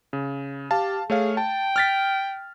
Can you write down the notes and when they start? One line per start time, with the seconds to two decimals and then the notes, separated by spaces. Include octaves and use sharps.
0.13 C#3
0.71 G4 F5 A5
1.10 A3 G#4 C#5 F5
1.37 G5 A5
1.76 F6 A6 B6